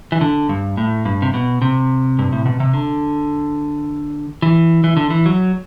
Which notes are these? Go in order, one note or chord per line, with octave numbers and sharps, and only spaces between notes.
E3
D3
G2
A2
G2
C3
B2
C3
G2
A2
B2
C3
D3
E3
E3
D3
E3
F#3